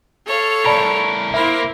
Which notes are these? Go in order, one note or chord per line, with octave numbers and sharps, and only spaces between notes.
A4 C#5 F5
A2 A#4 D5 A5 B5
A#3 E4 A#4 C5 E5 B5